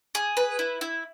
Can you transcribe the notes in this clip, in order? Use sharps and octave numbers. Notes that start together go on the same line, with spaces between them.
G#4
B4
E4
E4